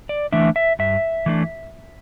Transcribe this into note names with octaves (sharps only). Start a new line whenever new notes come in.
D5
E3 A3 D4 E5
E5
G2 E5
E3 A3 D4